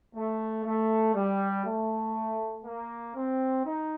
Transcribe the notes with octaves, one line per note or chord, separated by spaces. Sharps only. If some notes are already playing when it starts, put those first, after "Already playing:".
A3
A3
G3
A3
A#3
C4
D#4